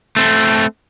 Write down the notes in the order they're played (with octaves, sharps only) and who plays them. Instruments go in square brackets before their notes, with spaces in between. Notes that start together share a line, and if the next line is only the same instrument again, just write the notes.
[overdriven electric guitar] A3 C4